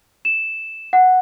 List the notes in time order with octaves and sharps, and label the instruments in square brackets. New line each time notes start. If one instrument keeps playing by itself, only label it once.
[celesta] E7
F#5